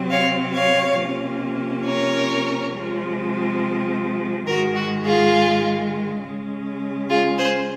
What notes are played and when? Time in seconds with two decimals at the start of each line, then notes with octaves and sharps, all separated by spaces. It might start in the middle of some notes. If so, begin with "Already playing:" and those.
Already playing: C3 F#3 C4
0.10 C#5 F5
0.54 C#5 F5
0.98 C3 F3 A#3 C#4
1.85 A#4 C#5
2.72 C3 F3 G#3 C4
4.47 G#2 D#3 G#3 F#4 A#4
4.76 F#4
5.04 F4 G#4
6.21 C#3 G#3 C#4
7.09 F4 G#4
7.38 G#4 C5